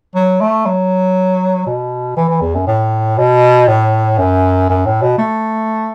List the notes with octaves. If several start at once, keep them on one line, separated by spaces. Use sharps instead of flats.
F#3
A3
F#3
B2
E3
E3
E2
F#2
A2
B2
A2
F#2
F#2
A2
B2
A3